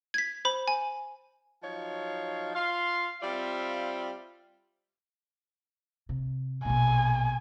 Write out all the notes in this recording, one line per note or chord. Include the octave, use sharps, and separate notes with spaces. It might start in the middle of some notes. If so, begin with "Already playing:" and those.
G#6 B6
C5 B5
G#5
F3 F#3 D#4 C#5 F5
F4 F5 C6
G3 C4 F4 D5 E5 F5
C3
A#1 B2 G#5